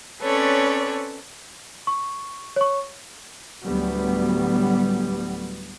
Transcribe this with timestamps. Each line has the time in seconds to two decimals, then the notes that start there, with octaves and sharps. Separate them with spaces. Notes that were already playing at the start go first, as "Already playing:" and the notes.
0.21 C4 C#4 A4 B4 C#5 D5
1.87 C#6
2.56 C#5 C#6
3.66 D2 A2 F#3 G3 B3